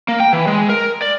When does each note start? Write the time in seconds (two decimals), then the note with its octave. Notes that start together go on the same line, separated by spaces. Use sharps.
0.08 A#3
0.20 G5
0.33 E3
0.47 G#3
0.69 A#4
1.02 D5